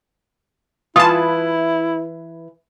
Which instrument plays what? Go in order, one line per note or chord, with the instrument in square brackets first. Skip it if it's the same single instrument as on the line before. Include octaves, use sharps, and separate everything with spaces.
[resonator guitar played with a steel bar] E3 B4 [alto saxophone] E4 [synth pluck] F4 A5 [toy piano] D#6